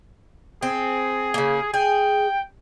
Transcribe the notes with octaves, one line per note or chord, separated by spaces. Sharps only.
C4 G#4
C#3 A#3
G#4 G5